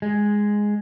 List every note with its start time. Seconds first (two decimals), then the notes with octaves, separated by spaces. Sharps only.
0.02 G#3